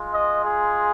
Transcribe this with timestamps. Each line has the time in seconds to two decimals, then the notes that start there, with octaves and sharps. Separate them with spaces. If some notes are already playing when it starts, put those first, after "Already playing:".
Already playing: G#3 F4
0.11 D#5
0.44 G#4